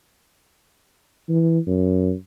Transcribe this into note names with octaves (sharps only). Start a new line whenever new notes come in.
E3
F#2